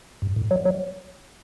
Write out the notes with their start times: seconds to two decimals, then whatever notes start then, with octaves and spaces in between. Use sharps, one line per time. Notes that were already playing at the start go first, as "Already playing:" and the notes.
0.22 G2
0.36 A2
0.51 F#3
0.65 F#3